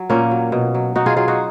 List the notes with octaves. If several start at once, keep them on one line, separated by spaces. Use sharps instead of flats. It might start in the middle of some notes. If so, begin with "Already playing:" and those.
Already playing: F#3
A#2 A#3 C#4
F#3
B2
F#3
B2 D#4 F#4
F4 G#4
F#3 F4 G#4
D#4 F#4